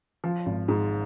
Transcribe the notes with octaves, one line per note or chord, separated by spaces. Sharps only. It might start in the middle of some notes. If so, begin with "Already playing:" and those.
F3
G#1
G#2